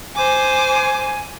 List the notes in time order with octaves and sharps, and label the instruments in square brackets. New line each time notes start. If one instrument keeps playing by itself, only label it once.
[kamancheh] C5 D6 [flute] G#5